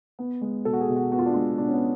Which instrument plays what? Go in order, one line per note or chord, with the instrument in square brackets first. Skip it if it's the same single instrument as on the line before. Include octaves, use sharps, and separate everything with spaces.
[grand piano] B3
G#3
B2 A4
F#4
G#4
B2
F#4
B3 F#4
F4
D4
G#3 F4
B2 D4
C#4
B3